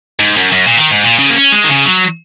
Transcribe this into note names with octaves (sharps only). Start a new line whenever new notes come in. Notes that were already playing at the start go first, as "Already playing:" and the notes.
G#2
F#2
F#2
A#2
D#3
G#2
A#2
C#3
A#3
C#4
G#3
D#3
C#3
F#3